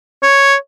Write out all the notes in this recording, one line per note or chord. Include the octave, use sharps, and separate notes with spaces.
C#5